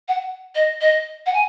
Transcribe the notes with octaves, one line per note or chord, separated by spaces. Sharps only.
F#5
D#5
D#5
F#5
G#5